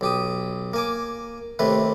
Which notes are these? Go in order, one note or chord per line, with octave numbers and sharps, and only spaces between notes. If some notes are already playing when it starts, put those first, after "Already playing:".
B1 G4 D#6
A#3 G#5 D6
D#2 C3 A3 B4